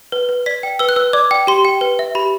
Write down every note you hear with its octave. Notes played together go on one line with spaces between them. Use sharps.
B4
B4
D5 B6
G5
B4 E6
F#6
B4 E6
D5 D6
G5
G4 C6
G5
B4
E5
G4 B5